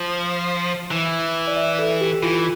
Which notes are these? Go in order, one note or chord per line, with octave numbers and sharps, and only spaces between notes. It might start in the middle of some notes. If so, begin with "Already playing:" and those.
Already playing: F3
E3
D5
E5
A4
G4
E3 F4